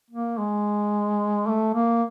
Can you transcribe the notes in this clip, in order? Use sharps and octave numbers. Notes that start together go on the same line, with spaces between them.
A#3
G#3
A3
A#3